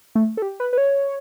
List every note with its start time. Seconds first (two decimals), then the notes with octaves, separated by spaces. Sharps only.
0.15 A3
0.37 A4
0.42 G4
0.60 B4
0.73 B4
0.78 C#5